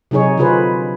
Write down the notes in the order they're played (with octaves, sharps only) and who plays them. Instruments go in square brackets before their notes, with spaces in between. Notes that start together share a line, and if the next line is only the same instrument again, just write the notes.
[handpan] C3 F#3 D#4 G#4 C#5
D3 F3 F4 G#4 B4 C5